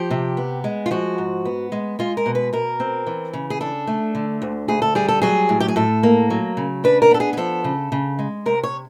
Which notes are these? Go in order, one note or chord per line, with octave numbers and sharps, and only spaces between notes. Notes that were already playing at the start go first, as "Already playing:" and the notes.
Already playing: F3 G4
C3
B3
G#3
F4
F3 F#4
G#2
B3
G#3
G#3 F4
A#4
B2
B4
B2 A#4
C4
E3
C#3
G#4
D4 A4
A3
D3
D2
D2 G#4
A4
G3 G#4
A4
F#3 G#4
A2
G4
G#4
A2 A4
A#3
F#3
C#3
D4 B4
A#4
B3 A4
G#4
G#4
F3 A4
C#3
C#3
G#3
C3 A#4
C#5